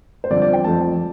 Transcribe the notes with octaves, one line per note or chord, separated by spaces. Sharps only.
C5
G2 D3 F3 C4 D5
D5
G5
F2 F3 A3 C4 A5